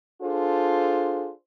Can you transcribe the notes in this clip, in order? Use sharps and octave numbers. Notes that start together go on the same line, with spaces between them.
D4 F4 G#4 A4 C5